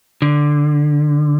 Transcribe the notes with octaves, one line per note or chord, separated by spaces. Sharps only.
D3